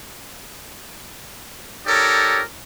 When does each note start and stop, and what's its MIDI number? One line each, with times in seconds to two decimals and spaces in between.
1.87 2.41 63
1.87 2.41 67
1.87 2.41 69
1.87 2.41 70
1.87 2.41 73
1.87 2.41 74